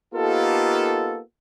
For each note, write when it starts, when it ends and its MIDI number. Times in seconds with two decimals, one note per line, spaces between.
0.15 1.21 58
0.15 1.21 59
0.15 1.21 63
0.15 1.21 65
0.15 1.21 67
0.15 1.21 69